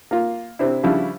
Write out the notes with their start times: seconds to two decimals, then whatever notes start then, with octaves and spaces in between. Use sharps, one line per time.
0.11 A#3 F4
0.59 C3 C4 D4 E4
0.83 C#3 F3 G3 D4 E4